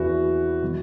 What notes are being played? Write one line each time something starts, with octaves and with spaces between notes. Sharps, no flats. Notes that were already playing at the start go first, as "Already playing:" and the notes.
Already playing: E2 E3 C#4 E4 F#4 B4
B2 F#3